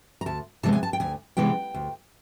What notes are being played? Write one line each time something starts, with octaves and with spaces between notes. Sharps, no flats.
A#5
D2 A5
C3 E3 G#3 B3 A5
G#5
A5
G5
D2 G#5
C3 E3 G#3 B3 G5
D2